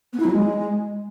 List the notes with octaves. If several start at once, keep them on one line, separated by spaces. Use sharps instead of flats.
B3
E4
F#3
G#3